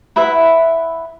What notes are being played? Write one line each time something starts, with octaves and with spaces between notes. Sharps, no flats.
E4 B4 E5 F#5